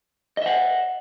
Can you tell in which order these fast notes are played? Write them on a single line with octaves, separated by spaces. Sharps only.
D#5 E5 F#5